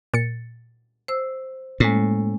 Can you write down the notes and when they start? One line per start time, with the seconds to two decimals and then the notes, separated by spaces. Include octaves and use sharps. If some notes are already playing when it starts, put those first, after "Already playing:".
0.14 A#2 A6 C#7
1.08 C5 E6
1.80 A2 G#3 A#3 C#4